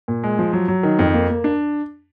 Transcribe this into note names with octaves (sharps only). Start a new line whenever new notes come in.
A#2
G#3
F3
F#3
F#3
D#3
F2
A#3
A#3
D4